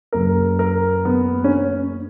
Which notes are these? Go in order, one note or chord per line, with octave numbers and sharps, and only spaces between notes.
F#1 F#2 C#3 A#4
A#4
B3
C#4